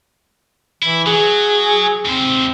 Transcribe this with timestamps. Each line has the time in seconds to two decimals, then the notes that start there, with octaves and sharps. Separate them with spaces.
0.82 E3 E4
1.06 F#3 G#4
2.05 D#2 C4 C5